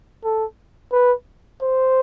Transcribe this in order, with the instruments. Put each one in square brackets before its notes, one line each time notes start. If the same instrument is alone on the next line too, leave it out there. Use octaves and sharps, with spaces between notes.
[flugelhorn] A4
B4
C5